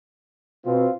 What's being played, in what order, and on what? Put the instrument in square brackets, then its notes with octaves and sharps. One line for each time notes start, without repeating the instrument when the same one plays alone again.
[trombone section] B2 C4 [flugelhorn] F4